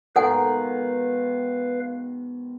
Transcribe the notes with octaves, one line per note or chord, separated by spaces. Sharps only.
G#2 B2 D#3 A4 B4 F5 F#5 G#5